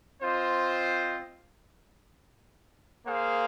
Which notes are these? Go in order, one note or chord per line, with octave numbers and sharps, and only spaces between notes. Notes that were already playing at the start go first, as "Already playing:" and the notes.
C4 F4 C5 D#5
A#3 G#4 C5 F5